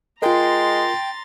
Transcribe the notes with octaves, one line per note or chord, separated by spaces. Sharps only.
G#3 F4 A#4 G5 A#5 C6 A6